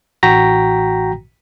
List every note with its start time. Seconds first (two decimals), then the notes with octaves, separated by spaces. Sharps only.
0.23 A1 F#4 G5 A#5 A#6 B6